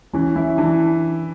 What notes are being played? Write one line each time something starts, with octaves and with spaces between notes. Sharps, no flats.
E3 C#4
C#4 E4
E3 D4